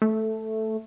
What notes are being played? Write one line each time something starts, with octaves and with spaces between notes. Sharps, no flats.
A3